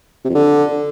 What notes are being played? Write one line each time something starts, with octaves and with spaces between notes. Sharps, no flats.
C3
F2
D3